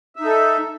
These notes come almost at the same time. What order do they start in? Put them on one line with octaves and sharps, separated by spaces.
E5 D#4 A4